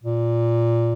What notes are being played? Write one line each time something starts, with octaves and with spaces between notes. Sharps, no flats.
A#2